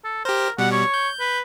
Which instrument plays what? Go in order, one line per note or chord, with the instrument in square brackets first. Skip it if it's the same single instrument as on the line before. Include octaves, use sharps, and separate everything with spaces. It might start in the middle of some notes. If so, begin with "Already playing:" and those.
[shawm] A4
[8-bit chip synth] G4 C5 [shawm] A#4
[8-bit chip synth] B2 G3 [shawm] F#5
[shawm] C#5
[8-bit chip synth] G6
[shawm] B4